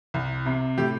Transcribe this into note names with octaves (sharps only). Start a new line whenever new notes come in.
C2
C3
A2 G4